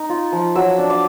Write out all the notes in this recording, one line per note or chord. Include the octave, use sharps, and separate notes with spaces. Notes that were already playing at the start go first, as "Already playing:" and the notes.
Already playing: D#4
F4
F3
F#3 E6
D4
D6